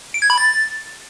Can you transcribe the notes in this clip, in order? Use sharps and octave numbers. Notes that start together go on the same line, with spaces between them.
D7
G#6
B5
A6